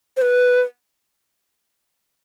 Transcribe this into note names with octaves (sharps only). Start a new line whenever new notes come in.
C5
B4